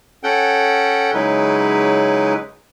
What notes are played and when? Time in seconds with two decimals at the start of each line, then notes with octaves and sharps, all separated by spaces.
0.24 C#4 A4 F#5 G5
1.14 C#3 F#3 G#3 D#4 E4 B4